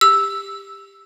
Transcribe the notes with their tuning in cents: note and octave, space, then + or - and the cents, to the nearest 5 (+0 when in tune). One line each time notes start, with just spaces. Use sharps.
G4 +15 E6 +0